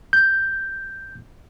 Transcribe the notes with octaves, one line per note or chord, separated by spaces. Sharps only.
G6